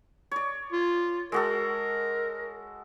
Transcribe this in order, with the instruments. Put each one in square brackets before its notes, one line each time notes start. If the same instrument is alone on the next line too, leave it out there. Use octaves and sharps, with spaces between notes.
[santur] C#5 D5
[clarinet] F4
[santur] G#3 F#4 A4 [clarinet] A#4